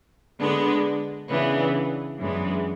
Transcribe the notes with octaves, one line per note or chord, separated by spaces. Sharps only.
D3 G#3 B3 D4
C#3 E3 B3 D4
F#2 E3 G#3 B3 D4